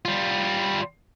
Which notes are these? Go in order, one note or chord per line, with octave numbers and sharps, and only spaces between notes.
G3 F4